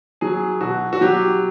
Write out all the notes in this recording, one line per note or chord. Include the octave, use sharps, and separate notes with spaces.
F#3 G#4
B2 F#4
F#4
F#3 G4